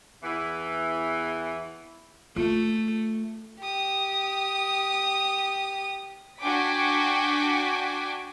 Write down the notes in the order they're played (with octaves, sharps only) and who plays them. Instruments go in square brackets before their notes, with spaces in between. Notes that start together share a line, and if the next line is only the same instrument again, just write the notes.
[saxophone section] E2 E3
[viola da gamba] A3 [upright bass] F4
[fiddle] G4 D#6
[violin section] D4 F#4 G5 G#5 D6 B6